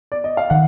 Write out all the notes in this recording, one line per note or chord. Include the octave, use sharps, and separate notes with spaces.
D5
D#5
F5
D#3 F#5